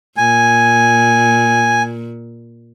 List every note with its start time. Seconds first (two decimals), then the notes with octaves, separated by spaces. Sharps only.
0.17 A#2 G#5